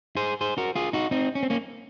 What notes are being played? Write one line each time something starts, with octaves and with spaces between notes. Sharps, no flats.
G#4 C5
G#4 C5
F#4 A#4
F4 G#4
D#4 F#4
C4 D#4
C#4
C4
A#3 C#4